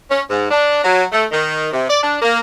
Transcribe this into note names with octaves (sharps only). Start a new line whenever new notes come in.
C#4
G#2
D4
F#3
A3
D#3
C3
D5
D4
A#3